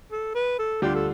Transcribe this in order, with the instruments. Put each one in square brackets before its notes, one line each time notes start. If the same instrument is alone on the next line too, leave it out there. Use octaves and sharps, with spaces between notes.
[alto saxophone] A4
B4
A4
[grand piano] D2 D3 G3 D4 F4 [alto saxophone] G4
[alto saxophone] A4